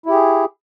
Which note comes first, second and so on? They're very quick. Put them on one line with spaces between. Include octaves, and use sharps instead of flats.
E4 G4 G#4